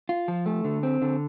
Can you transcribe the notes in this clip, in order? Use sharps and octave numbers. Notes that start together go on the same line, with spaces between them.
F4
F3
A3
D3
C4
D3